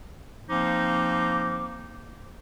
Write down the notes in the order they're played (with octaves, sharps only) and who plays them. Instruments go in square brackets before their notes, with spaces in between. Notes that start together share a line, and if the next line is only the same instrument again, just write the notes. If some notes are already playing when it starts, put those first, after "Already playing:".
[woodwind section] F3 A#3 C4 D#4 D6